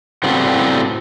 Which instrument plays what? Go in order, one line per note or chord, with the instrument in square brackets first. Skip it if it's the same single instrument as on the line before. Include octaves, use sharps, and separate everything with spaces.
[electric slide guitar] A2 C#3 G3 B3 C4 F#4